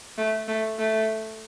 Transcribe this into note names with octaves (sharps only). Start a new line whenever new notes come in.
A3
A3
A3